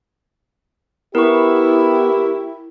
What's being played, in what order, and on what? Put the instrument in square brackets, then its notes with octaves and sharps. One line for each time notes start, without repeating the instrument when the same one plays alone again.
[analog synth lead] B3 [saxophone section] E4 [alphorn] G4 [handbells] A#4 C#6